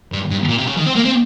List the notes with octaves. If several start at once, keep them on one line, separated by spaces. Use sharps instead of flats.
G2
G2
A#2
C3
C#3
D#3
C4
A#3
C4